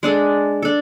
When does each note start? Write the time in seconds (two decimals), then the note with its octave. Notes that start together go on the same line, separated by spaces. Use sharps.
0.03 G#3 D4 A4
0.62 D4 A4